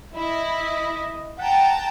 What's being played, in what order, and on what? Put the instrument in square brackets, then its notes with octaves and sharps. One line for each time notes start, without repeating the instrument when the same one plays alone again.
[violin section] E4 [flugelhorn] D#5
[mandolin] G4 [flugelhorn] F#5 [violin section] G5 A5 A#5